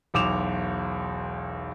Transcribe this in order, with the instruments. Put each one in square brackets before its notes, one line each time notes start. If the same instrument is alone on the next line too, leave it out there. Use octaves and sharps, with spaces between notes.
[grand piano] E1 B1 D6 E7 F7